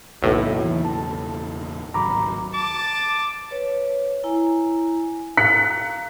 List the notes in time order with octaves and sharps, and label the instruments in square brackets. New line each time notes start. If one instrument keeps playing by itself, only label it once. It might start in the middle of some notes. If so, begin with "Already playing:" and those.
[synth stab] B1 A2 [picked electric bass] E2 C#3 A#3
[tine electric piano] E3
A5
[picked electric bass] G#1 C#2 F#3 [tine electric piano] A#5 B5 D6
[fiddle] A5 [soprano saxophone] D6
[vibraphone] B4 C#5
E4 G#5 A#5
[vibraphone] F5 A#5 [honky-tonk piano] F#6 B6 C#7